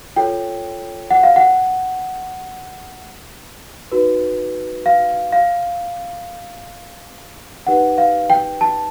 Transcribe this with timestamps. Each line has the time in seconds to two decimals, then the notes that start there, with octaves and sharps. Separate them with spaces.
0.16 F4 A4 C#5 G5
1.11 F#5
1.23 F5
1.36 F#5
3.92 D#4 F#4 B4
4.86 F5
5.32 F5
7.67 D#4 G4 B4 F#5
7.98 F5
8.30 G5
8.61 A5